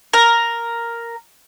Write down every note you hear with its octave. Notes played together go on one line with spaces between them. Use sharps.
A#4